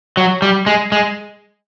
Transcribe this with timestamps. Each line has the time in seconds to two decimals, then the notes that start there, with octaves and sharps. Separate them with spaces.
0.17 F#3
0.42 G3
0.67 G#3
0.92 G#3